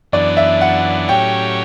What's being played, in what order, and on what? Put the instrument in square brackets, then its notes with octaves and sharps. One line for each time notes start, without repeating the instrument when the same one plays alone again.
[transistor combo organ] F#2 E3 B3 D4 [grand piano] D5
[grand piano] E5
F#5
[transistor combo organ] A2 F#3 C#4 G4 C#5 [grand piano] G5